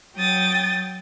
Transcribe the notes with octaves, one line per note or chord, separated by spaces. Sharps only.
F#3 G5 D#6 A6